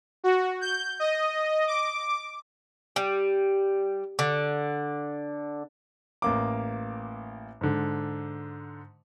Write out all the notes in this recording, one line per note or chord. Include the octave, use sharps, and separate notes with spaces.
F#4
G6
D#5
D6
G3
D3
A1 A#3 D6
G#2 D3